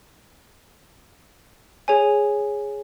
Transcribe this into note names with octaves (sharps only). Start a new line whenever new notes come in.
G#4 C#5 G#5